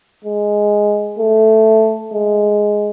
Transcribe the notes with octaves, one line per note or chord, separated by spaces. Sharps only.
G#3
A3
G#3